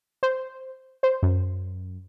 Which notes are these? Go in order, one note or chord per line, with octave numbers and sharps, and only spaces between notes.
C5
C5
F#2